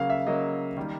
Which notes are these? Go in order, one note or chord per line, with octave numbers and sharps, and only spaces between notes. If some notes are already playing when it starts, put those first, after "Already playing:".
Already playing: C#3 F#3 A#3 F5
E5
C#3 F#3 A#3 D#5
D#3 G3 A#3